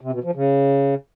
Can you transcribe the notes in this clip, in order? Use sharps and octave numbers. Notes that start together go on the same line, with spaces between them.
C3
B2
F3
C#3